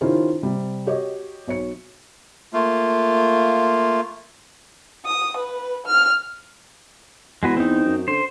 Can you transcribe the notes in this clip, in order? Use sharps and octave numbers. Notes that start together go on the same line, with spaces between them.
D#3 C#4 E4 F4 G4 C5
C3 G3
F#4 G4 C#5 D#5
B1 C#5 C#7
A3 A#3 F4
D#6
B4
F6
E2 G#3 F#4 B4
C4 D#4
F#2
D3 C5